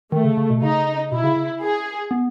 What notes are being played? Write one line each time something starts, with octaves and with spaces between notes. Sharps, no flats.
D#3 A3
C#3
C#3
B2
C#3 D#4
B2 E4
C#3
C#3
G#4
B3